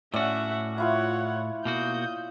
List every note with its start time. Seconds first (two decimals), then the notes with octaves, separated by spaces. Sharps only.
0.14 A2 C#4 F#4 D5 E5 F#5
0.78 E4 F4 C#5 F#5 D6
1.65 B2 A#3 F#4 D#6 G6